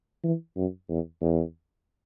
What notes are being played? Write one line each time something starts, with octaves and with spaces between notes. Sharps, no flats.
E3
F#2
E2
E2